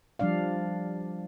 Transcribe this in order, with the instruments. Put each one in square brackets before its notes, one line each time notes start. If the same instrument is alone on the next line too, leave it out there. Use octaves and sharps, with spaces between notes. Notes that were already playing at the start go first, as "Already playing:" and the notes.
[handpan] F3 G3 D4 D5 F5